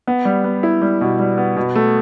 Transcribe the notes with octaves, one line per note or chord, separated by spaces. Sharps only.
B3
G3
B3
E4
G3
B2
G3
B3
B2
A3